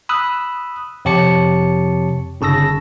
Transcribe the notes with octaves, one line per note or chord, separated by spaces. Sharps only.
B5 D#6 E6 F#6
F2 C3 G4 C#5 A5 C#7
G1 C#3 A5 E6 A#6